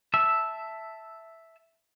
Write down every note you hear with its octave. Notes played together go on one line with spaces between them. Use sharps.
E5 A5 E6